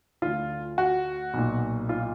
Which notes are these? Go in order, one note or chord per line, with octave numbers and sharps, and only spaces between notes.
D2 D3 F4
F#4
B1 A#2
F4